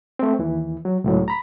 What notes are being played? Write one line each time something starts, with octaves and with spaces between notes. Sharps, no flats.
A3 C4
D#2 E3
F#3
C#2 A2 F#3
A#5 B5